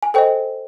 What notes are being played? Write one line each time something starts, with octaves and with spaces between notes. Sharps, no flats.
G#5
A4 C5 D#5 G5